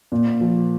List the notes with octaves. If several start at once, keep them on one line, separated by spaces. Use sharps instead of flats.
A#2
F3